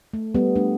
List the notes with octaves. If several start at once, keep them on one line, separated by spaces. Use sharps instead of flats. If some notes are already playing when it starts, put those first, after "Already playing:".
A3
G3 B3
A3 D4